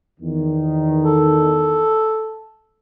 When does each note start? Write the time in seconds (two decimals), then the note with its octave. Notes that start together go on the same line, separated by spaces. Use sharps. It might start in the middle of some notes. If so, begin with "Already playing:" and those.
0.20 E2 D#3
1.03 A4